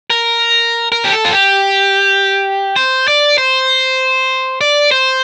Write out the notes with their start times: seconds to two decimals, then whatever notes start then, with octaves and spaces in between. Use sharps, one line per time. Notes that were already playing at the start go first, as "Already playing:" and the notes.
0.10 A#4
0.92 A#4
1.05 G4
1.12 A4
1.25 F4
1.33 G4
2.76 C5
3.08 D5
3.38 C5
4.61 D5
4.91 C5